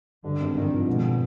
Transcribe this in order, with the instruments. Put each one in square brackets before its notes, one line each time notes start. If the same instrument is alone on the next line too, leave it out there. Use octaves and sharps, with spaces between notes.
[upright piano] G2 [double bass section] D3
[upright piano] G#1
[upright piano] D3 [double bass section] D#3
[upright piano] F3
[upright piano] G#2 [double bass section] B2